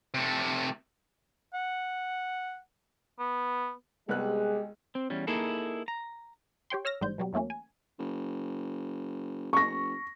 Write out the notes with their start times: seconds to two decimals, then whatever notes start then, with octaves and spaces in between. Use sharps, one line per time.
0.14 C3 A3
1.54 F#5
3.19 B3
4.09 C2 G#3 B3 G4 G#4 F#6
4.95 C4
5.10 E2 G3 C#4
5.27 A#3 D#4 E4 G#4 A4
5.88 A#5
6.70 G4 C#5 G5 C6
6.85 C#5 E6 F6 A#6
7.01 A1 G#2 G3 C5 G6
7.18 B2 F#3 G3
7.33 E2 F#3 A3 A#3 C#4
7.50 G#5
7.99 F#1
9.53 F#1 C#6 A#6